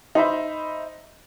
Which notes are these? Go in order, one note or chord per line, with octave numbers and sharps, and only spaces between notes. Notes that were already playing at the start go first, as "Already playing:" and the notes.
D#4 C5 E5 B5